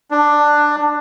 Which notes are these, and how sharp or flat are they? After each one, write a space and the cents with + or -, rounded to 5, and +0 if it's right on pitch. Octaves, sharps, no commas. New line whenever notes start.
D4 +10